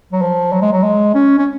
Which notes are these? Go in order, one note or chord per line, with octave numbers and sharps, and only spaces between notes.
F#3
F3
F#3
G#3
F#3
G#3
C#4
C#4